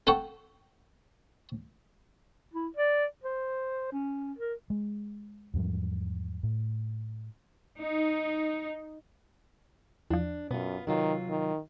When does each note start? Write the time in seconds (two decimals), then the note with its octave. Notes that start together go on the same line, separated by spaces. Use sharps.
0.07 A4 F#5 G5 C#6
2.54 E4
2.77 D5
3.24 C5
3.92 C#4
4.38 A#4
4.70 G#3
5.54 E2 G#2 F3 G3
6.43 A2
7.80 D#4
10.11 E2 F3 D4
10.51 F#2 B2 B3 F4
10.87 C3 D#3 F#3 F4
11.29 D#3